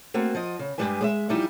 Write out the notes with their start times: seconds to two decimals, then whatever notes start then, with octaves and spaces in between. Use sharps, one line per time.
0.14 A3 A#3 C4 F#4
0.34 F3 D#5
0.59 C#3
0.78 G2 C3 G3 G#3 B4 G#5
1.01 G#3 D5 E5
1.29 E3 F3 G3 D#4 E4